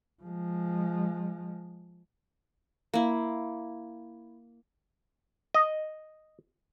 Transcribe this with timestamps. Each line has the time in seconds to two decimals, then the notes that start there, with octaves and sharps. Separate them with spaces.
0.23 F3 G#3
2.94 A#3 E4
5.54 D#5